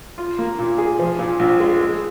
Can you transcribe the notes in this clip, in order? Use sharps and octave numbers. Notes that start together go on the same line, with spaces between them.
F4
A#3
A#2
G#4
F3
A#2
A#1
G#3
G#3